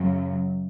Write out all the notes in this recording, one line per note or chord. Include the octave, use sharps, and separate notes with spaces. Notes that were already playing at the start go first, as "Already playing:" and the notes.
Already playing: F#2 C#3 F#3